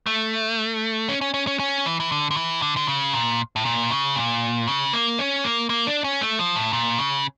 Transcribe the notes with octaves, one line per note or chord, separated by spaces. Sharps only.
A3
C#4
C#4
C#4
C#4
C#4
E3
E3
D3
D3
E3
D3
D3
C#3
A#2
A2
A#2
C#3
A#2
C#3
A#3
C#4
A#3
A#3
D4
C#4
A3
F3
A2
A#2
C#3